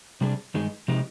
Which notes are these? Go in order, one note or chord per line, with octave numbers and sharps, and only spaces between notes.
C3 G3 D4 G#4
G2 D#3 G#3 D#4 G#4
C3 F3 G#3 D#4 G4